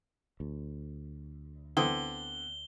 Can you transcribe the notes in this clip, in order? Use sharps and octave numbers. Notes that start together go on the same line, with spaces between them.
D2
D3 B3 C4 E4 G7